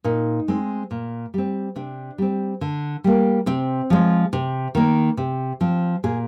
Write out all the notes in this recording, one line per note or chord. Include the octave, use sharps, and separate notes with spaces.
A#2 D#4
G#3 C4
A#2
G3 C4
C3 D4
G3 C4
D3
G3 A#3
C3 C4
F3 G#3
C3
D#3 A#3
C3
F3 C4
A#2 G#4